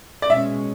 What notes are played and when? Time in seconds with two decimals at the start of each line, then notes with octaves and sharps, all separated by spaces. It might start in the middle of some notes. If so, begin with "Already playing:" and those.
0.22 D5
0.29 B2 G#3 C#4 E5